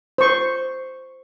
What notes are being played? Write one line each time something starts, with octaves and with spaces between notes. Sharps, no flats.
C5 C#6